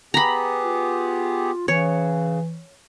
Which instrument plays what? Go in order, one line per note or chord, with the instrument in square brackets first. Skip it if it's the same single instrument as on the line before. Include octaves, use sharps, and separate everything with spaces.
[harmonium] B3 G4 G#4 [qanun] A#5 B5
[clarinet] F4
[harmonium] C#3 [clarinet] E3 [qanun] C#5